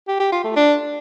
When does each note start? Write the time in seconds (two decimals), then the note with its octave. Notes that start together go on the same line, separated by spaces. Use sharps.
0.08 G4
0.20 G4
0.32 F4
0.44 A3
0.56 D4